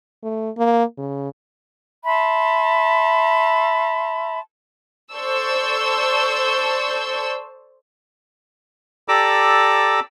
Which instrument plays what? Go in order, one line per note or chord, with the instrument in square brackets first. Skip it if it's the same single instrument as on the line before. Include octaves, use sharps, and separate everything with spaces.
[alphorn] A3
A#3
C#3
[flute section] E5 A5 B5 C6
[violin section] A4 C5 D5 C#6 E6 G6
[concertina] G4 A4 D5 A#5 D6 E6